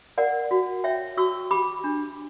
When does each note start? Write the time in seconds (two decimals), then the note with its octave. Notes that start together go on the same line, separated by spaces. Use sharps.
0.18 A#4 D5 F#5
0.51 F#4
0.84 C#5 E5 G5
1.17 F#4 C#6 E6
1.51 G4 B5 D6
1.84 D4